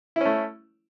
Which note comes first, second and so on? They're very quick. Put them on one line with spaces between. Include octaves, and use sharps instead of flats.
E4 C#4 A3